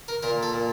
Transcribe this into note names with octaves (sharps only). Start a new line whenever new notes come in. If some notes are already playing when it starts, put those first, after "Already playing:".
A#4
A#2 A#4
A4
A#2